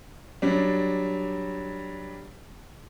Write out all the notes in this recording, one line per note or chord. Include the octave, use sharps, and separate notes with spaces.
F#3 G3 D4